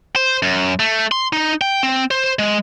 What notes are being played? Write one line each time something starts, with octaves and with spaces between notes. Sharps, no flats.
C5
F#2
A3
C6
D#4
G5
C4
C5
G#3